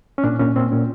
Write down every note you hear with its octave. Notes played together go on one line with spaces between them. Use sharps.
C#4
A#2 D4
A#2 C#4
A#2 C4
A#2 C#4